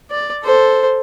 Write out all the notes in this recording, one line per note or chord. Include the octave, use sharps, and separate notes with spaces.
D5
A4 C5